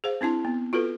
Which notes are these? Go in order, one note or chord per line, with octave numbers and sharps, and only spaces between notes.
G#4 C5 F5
C4 D4 E4 A5
B3
F4 F#4 A4 B4